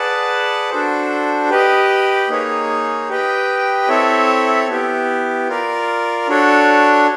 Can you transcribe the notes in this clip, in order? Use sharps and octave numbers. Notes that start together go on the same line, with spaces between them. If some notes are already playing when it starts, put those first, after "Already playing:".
Already playing: G#4 B4 D5 F#5 A5
D4 F#4 A4 C5
G4 B4 D#5
A#3 D#4 G#4 C#5
G4 B4 D#5 G5
C4 E4 A4 C#5 E5
B3 E4 G4
F4 A#4 D5
D4 F#4 A4 C#5